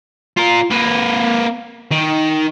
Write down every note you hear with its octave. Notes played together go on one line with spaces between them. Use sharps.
F4 A#4
A#3 B4
D#3